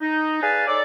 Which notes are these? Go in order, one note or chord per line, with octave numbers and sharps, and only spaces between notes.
D#4
G#4 B4 D5 F5 G#5 A5
D#4 A4 C#5 D5